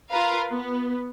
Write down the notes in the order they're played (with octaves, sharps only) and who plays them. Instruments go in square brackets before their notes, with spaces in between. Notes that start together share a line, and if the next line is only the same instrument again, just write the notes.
[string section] F4 A#4 B4 F5
B3